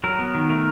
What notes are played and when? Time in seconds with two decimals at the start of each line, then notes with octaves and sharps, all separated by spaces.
0.04 F#3 A#4
0.19 B3
0.35 D#3
0.49 A3 A#4